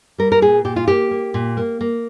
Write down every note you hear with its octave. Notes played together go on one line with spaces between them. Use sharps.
G3 A#4
A#4
A#2 G#4
A#2 G4
F4
A#3 G4
A#3
A#2
A#3
A#3